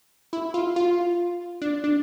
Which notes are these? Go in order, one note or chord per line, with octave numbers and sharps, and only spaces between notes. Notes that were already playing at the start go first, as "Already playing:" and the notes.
E4
F4
F4
D4
D4